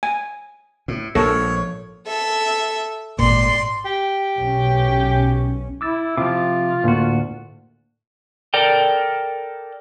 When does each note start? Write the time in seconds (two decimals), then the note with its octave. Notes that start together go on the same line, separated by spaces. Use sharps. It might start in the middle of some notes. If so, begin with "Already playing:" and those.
0.03 G#5
0.88 A2
1.15 A#1 G#2 A4 A#4 C#5
2.07 A4 E5
3.19 G#1 A#2 D5 C6
3.85 G4
4.38 B1 C#4
5.81 E4 D6 E6 A6
6.17 C3 F3 F4 D6
6.84 D2 A2 A#3 F#4
8.54 A4 A#4 D5 G5